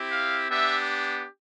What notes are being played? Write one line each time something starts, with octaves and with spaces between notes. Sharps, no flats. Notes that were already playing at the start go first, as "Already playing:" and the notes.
Already playing: C4 E4 G4
F5
B3 D4 G4 E5